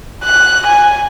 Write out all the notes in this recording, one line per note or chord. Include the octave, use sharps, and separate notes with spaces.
F#6
G#5